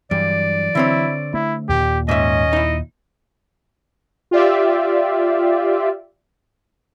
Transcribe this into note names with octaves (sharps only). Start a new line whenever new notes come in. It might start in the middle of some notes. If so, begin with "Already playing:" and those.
G2 E3 F#3 D5
D3 C4 E4 C#5
A3 E4
D#2 A#2 G4
G#2 C#4 D#5 E5
D#4 E4
F4 G4 D5 E5